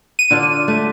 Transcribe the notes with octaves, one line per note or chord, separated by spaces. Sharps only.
D#7
D3 D4 F4
A3